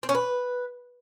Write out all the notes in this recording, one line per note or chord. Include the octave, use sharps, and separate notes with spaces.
C4
C#4
B4